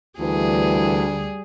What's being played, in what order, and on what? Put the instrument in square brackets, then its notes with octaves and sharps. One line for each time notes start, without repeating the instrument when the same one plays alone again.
[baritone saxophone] D2 [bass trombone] E3 [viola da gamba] G3 G#4